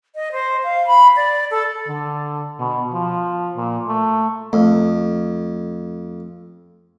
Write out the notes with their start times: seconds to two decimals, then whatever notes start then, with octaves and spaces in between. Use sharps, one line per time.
0.15 D#5
0.32 C5
0.64 F5
0.87 B5
1.16 D5
1.51 A4
1.88 D3
2.59 B2
2.93 F3
3.57 A#2
3.87 A3
4.53 F2 A3